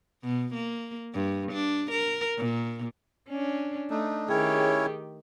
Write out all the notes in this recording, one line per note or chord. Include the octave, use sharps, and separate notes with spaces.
B2
A#3
G2
D4
A#4
A#2
C#4 D4
A3 D4 D#4
D#3 C#4 E4 G4 G#4 C#5 G5